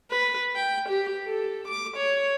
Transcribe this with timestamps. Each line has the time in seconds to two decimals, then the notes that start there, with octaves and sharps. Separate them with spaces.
0.10 B4
0.56 G5
0.89 G4
1.26 A4
1.68 D6
1.97 C#5